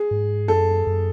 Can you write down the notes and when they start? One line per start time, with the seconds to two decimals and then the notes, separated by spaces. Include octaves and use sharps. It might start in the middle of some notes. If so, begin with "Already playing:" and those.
Already playing: G#4
0.11 G#2
0.48 F#2 A4
0.87 F#2